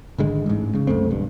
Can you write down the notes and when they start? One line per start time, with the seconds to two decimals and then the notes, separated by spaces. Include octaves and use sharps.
0.18 G#1 D3 G#3
0.46 A1 G#2
0.75 C#3
0.87 C2 F#2 A3 C4
1.10 E1 G2